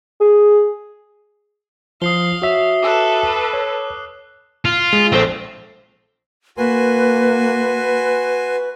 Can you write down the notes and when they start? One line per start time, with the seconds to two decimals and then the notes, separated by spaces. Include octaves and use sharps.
0.21 G#4
2.02 F3 F5 D#6 C7 G7
2.42 F#4 C#5 E5
2.83 A4 B4 D6 E6 F#6
3.53 C#5
4.65 F4
4.93 G#3
5.12 A#1 C4 A4 C5
6.58 A#3 F#4 B4 G#5 C6